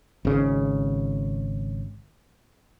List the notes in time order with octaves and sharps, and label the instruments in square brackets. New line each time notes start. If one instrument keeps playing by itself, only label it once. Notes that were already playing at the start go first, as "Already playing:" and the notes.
[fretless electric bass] G#1 C#3